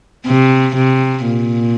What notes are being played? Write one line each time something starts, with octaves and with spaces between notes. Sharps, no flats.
C3
C3
A#2